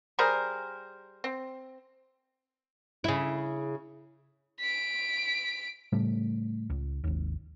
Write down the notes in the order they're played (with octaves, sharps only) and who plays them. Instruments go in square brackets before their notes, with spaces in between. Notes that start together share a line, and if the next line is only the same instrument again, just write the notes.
[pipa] G3 G#4 A#4 C5
C4
[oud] C#3 E4
[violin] B6 D7
[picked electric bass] A2 C#3 G3 A3
C#2
G#1 D#2